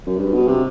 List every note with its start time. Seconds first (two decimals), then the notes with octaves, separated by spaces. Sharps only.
0.06 F#2
0.17 G2
0.33 B2
0.47 C3